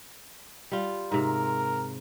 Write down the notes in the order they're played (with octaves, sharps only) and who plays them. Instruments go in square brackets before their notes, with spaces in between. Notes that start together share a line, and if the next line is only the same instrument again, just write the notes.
[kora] G3 F4
[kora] G#2 C3 [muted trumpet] A#4